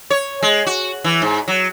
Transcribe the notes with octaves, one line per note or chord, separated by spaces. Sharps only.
C#5
G#3
F#4
E3
G#2
F#3